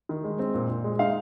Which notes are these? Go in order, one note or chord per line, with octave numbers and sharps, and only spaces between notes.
D#3
G#3
C4
A#2
A#2
G#3
D#4 F5